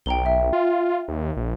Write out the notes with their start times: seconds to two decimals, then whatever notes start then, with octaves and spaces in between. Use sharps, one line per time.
0.06 B1 G5 A#5 G7
0.26 E5
0.53 F4
1.08 D#2
1.37 A#1